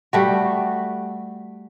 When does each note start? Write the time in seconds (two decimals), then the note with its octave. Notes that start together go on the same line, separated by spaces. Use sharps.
0.13 G3 A3 F#4